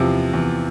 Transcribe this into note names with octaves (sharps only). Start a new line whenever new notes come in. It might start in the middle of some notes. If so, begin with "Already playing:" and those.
Already playing: E2 C3 F3
E2